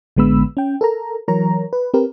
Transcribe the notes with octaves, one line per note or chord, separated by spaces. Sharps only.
A1 D3 G#3 B3 B5 E6
C#4 G5
A4 A#4 A#5
E3 F#3 A#4 C#5 A#5
B4
C4 G4 A#4 B4